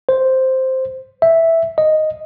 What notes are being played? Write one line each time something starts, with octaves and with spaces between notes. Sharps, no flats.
C5
E5
D#5